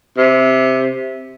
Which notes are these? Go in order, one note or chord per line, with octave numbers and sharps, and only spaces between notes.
C3